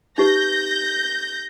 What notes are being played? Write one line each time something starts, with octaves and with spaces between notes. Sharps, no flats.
D#4 G4 B4 G6 A#6